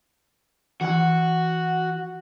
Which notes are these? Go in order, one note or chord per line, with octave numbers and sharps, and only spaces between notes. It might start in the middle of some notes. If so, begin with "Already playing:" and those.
E3 F#4 F#5